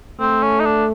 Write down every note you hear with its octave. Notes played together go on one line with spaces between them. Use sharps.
A3 C4
C#4
D#4
D4